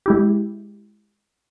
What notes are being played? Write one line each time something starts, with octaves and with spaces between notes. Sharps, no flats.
G#3 E4 G4